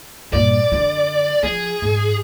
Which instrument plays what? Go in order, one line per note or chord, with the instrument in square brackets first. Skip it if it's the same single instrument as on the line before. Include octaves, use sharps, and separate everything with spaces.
[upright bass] G2 A#2 [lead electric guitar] D5
[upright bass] F#2 D3
[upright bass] F3 [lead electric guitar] G#4
[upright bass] G#2